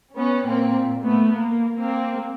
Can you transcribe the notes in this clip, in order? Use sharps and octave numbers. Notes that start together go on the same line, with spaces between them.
B3 C#4
A#2 A#3 C4
A3 B3
A#3
A#3 C4